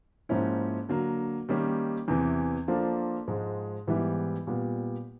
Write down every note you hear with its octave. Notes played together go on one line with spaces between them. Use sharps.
G#2 F3 A#3 C#4 E4
D3 F#3 A#3
D#3 G3 A#3 C#4
E2 C3 E3
F3 A#3 D4 F4 A4
G#2 F3 G#3
G#2 E3 G3 B3 E4
A#2 G3 B3